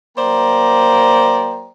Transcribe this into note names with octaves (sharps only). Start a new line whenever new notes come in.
F#3 A#3 C5 D5 G5 A#5